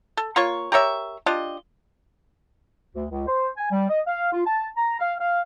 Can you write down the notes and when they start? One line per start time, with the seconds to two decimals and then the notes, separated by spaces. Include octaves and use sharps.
0.17 A4
0.36 A#3 F4 C#5 C#6
0.72 G4 A#4 C#5 E5
1.26 D4 F4 G4 D#5
2.95 D2
3.11 C#2
3.27 C5
3.58 G#5
3.72 G3
3.90 D#5
4.07 F5
4.33 F4
4.46 A5
4.77 A#5
5.00 F5
5.21 F5